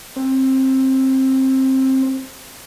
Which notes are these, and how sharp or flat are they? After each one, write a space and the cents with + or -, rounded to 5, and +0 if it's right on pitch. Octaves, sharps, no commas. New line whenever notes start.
C4 +20